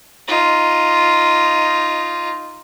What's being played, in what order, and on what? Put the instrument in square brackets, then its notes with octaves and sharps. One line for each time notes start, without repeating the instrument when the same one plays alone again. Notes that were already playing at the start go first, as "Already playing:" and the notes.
[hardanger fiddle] D#4 F4